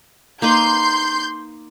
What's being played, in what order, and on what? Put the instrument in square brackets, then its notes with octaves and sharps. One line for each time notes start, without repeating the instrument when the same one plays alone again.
[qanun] A#3 D#4 B4 [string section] C6 G6